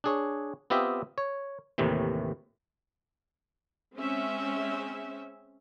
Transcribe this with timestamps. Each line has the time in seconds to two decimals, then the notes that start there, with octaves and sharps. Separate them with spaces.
0.04 D4 G#4 C#5
0.70 B3 C4 F4 G4 D#5 E5
1.18 C#5
1.78 D#2 A2 C3 D#3 E3
3.97 G#3 C4 C#4 E5